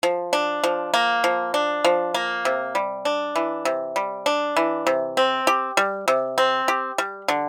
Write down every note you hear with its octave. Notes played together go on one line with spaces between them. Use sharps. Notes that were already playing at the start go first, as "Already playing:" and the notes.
F3
D4
F3
A#3
F3
D4
F3
A#3
C3
G3
D4
E3
C3
G3
D4
E3
C3
C4
G4
G3
C3
C4
G4
G3
D3